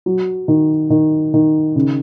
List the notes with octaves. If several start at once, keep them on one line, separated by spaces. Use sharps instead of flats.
F#3
D#3
D#3
D#3
C#3